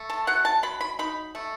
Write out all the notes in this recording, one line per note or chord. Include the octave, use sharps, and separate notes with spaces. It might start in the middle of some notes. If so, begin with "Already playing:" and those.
Already playing: A3
A5
F#3 F#5
A5
F#3 B5
B5
D#4 B5
A3